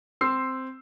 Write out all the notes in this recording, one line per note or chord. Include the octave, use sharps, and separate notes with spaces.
C4 E6 C7